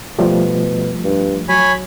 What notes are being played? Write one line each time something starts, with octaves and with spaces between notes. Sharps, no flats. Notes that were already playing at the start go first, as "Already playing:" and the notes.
B2 F3 G3 A3
G2
F#3 C#5 G#5 B5